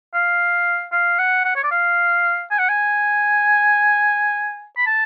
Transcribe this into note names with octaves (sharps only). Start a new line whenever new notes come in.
F5
F5
F#5
F#5
C#5
D5
F5
G#5
F#5
G#5
B5
A5